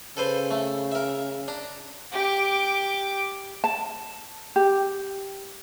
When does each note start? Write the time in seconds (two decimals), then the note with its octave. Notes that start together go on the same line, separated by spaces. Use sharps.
0.17 C#3 A4 B4 C5
0.51 A3
0.92 A#4 E5
1.48 D4 A#5
2.12 G4 D6
3.64 A5
4.56 G4